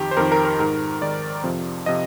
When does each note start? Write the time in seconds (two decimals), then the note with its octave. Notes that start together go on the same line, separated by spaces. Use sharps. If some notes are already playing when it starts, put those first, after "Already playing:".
Already playing: F2 D#3 G4
0.11 C5
0.17 F2 D#3 A#4
0.32 A#4
0.45 A#4
0.59 G#2 D#3 A#4
1.01 G#2 D#3 D5
1.44 F2 C3 F3
1.86 C3 F3 D#5